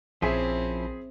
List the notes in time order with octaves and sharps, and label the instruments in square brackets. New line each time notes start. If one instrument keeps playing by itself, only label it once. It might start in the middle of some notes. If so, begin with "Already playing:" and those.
[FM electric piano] A#1 [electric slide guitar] F3 C#4 E4 [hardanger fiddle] C4 [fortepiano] G#4 C5 E5